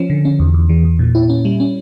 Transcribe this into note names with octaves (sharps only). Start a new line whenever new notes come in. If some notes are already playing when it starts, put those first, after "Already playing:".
Already playing: F3 C#4
D3
C#4
E2
E2
E3
E2
A#2
E4
C#4
G3
C#4